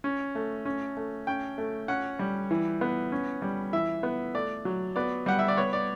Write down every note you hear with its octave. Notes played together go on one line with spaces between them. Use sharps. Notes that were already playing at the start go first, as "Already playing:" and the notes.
C#4
A3
C#4
A3
C#4 G5
A3
C#4 F#5
G3
E3
B3
C#4
G3
E3 E5
B3
A3 D5
F#3
B3 D5
G3 F#5
E5
D5
B3 C#5
D5